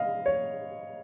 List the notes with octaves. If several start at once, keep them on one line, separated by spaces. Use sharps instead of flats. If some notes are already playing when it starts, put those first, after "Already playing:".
Already playing: D#5 F5
C#5